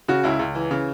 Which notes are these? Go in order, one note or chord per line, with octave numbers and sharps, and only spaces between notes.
C#3 F#4
C#2 E4
C#2
E3
C#3